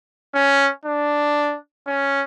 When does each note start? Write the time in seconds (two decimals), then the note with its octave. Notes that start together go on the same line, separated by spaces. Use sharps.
0.35 C#4
0.85 D4
1.87 C#4